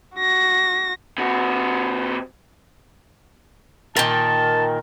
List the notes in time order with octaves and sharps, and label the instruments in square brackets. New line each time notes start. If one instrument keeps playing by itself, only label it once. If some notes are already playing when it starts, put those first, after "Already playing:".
[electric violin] F#4 A#6
[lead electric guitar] C3 F#4
[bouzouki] A#2 D#3 [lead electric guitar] A#4 G5 [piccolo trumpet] A5